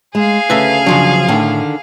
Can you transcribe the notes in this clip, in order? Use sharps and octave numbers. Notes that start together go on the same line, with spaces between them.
G#3 G#4 F5
D2 C#3 A4 B4 E5
C#3 F3 F#3 D4
A2 D3 D#3 A4